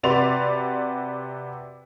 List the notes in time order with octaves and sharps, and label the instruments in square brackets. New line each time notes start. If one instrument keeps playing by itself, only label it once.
[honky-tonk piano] C3 F#4 B4 D5 C6 F7